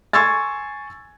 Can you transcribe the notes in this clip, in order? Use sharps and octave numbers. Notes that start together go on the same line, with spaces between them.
G#5 C6 C#6 E6 G#6 A6